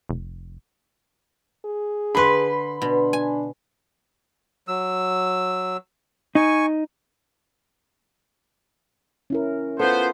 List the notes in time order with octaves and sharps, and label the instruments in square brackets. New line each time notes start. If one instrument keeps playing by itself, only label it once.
[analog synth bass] F1
[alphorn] G#4
[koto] D3 B4 [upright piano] B5 C6
[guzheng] B2 [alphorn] D4
[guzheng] G#5
[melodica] F#3 E6
[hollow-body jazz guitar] D#4 [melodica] G#5 C#6
[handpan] C#4 E4 A#4
[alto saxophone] B3 [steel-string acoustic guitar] F4 A4 [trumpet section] C5